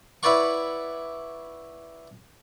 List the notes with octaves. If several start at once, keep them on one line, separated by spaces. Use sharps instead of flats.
E4 B4 C#5 D5 F#5 C#6